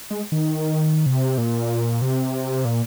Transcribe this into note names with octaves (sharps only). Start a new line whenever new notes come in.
G#3
D#3
C3
A#2
C3
A#2